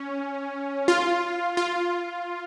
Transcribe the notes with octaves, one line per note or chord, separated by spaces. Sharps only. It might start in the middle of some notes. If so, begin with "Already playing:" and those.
Already playing: C#4
F4
F4